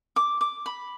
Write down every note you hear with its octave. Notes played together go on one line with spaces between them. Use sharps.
D6
D6
B5